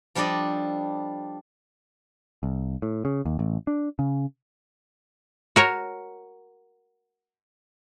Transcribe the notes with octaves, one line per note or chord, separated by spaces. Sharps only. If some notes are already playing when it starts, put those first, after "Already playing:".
F3 G3 D4 A4 D5 D#5
C2
A2
C#3
D#2
A1
D4
C#3
F#4 A#4 C#5